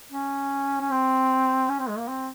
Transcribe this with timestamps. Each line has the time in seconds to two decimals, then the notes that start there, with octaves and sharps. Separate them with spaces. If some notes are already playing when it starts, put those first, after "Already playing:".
0.12 C#4
0.81 C#4
0.91 C4
1.69 C#4
1.79 C4
1.89 G#3
1.98 A#3
2.08 C4